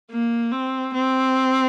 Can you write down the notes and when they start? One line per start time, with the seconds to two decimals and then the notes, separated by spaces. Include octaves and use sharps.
0.11 A#3
0.52 C4
0.94 C4